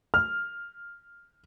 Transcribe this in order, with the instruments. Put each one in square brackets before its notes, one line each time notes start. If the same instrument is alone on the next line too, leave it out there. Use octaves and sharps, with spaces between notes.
[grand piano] F6